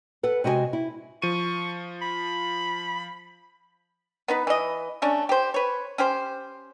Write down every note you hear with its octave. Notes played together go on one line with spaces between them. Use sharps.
A4 B4 F#5
C3 G#3 F#4 D#5 G5 G#5
E4
F3 C#6 D#7
B5
B3 D#4 B4
E3 D#5
A3 C#4 D4
G4 C5
B4 C#5
C#4 G4 C5